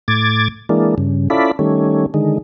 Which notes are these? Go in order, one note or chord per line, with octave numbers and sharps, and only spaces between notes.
A2 D6 G#6 A6
E3 G#3 A#3 D4
G2 C#3
C#4 E4 F4 A4 D5 B5
D#3 G3 A3 C#4
D3 D#3 G#3